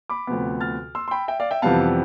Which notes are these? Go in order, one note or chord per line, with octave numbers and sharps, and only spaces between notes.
B5 D6
D2 C3 F3 B3
F6 A6
C6 E6
C6
G5 B5
E5 G5
D5 F5
E5 G5
F2 C3 E3 G3 B3 F5 A5